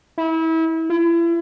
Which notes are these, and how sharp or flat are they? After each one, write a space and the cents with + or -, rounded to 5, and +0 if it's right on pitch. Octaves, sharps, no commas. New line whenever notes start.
E4 -30
E4 +35